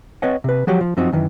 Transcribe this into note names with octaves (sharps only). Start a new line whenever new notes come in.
C4 B4 C#5 D#5 F#5
C3 B4
F3 F#3 F#4 G4 C#5
F3
F#2 F3 C4 D#4 F#4
F#2 D#3 E3